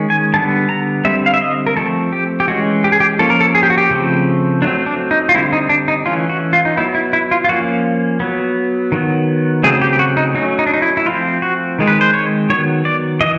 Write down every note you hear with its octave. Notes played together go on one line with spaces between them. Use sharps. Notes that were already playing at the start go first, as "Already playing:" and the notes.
Already playing: D#3 G#3 C#4
G#5
D3 G3 B3 A5
A#5
D3 G3 C4 E5
F5
E5
D#5
A#4
F3 A3 C4 A4
G4
G4
E3 G#3 C#4 F#4
G4
G#4
G4
F3 A#3 C#4 A4
A#4
A4
G#4
G4
F#4
G4
C#3 F3 A3 C4
F#3 A3 C4 D4
D4
D#4
F4
D3 G3 C4 E4
D#4
D4
D#4
E3 A3 C#4 F4
F#4
F4
D#4
F#3 B3 E4
E4
E4
F4
F4
F3 A#3 C#4 F#4
F#3 B3
D#3 F#3 B3
C#3 F#3 A3 C4 G#4
G4
G4
F#4
D#4
F#3 A3 C#4 D#4
D#4
D4
D#4
E4
E4
F3 A3 C4 F4
F#4
D#3 G#3 C4
B4
C5
C#5
D#3 F#3 B3 C#5
D5
E3 D#5